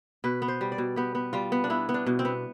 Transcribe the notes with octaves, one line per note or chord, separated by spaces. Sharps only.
B2 B4
B3
C5
G3
D5
B2
B3 G4
B3
G3 F4
B3
D4
B3 E4
B3
D4
B2
C4
B3